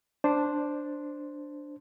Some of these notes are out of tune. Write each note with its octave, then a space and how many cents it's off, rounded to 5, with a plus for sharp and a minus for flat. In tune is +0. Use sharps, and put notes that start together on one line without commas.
D4 +0 C5 +0